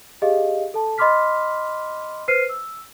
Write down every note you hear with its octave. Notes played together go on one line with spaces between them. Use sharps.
G4 G#4 D#5 F5
A4 A5
D#5 B5 C6 D6 F6 B6
B4 C5 F6 C7 D#7
E6